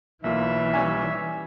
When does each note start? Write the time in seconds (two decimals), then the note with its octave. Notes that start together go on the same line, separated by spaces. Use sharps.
0.24 B1 E3 A#3 F4 E5
0.73 G3 C#4 G#5